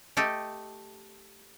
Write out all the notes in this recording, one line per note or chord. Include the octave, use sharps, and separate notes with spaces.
A3 G4 A4 D#5